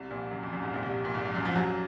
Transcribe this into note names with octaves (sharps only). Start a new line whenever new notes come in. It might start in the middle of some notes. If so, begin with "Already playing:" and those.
Already playing: C2 C3
A#1 A#2
F#2
F2
F#2
G#1 G#2
A#1 A#2
C2 C3
A#1 A#2
G#1 G#2
F2
F#2
F2 F3
F#2 F#3